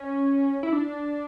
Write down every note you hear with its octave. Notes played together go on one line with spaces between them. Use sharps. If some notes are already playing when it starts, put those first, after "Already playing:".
Already playing: C#4
E4
D4